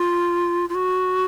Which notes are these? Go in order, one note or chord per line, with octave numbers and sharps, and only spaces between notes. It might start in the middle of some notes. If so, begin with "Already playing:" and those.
Already playing: F4
F4
F#4